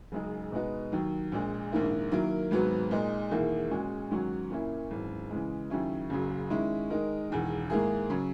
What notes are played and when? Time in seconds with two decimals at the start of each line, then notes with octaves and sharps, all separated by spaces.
0.12 F#1 F#2 C#3 G#3 D#4
0.52 B2 G#3 B3 D#4
0.92 D#2 D#3 F#3
1.32 A#1 A#2 G#3
1.72 A#1 G#2 D#3 A#3 E4
2.12 D#3 F#3 A#3 E4 A#4
2.51 G#1 G#2 F#3 B3 F#4
2.91 A#2 G#3 D#4
3.31 E1 E2 D#3 A#3 E4
3.71 A#2 G#3 C#4 F#4
4.11 G#2 D#3 F#3 C#4 F#4
4.51 A#2 A#3 C#4 E4
4.91 G#1 F#2 E3
5.30 C#3 E3 G#3
5.70 D#2 C#3 F#3 C#4 E4
6.10 F#1 F#2 C#3 F#3
6.50 D#3 G#3 C#4 E4
6.90 D#3 G#3 D#4 A#4
7.30 E1 E2 D#3
7.70 G#2 D#3 A#3 E4 G#4
8.10 C#3 F#3 C#4